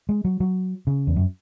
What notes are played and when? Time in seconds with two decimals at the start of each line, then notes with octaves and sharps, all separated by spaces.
0.09 G#3
0.25 F#3
0.40 F#3
0.87 C#3
1.07 E2
1.16 F#2